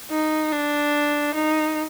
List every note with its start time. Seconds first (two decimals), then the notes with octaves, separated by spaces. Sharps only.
0.10 D#4
0.52 D4
1.34 D#4